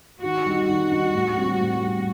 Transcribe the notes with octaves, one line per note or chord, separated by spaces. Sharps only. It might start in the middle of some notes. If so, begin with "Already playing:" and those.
D#3 F#4
G3 D#4
D#3 F#4
G3 D#4
A2
G3 C4
A2
G3 C4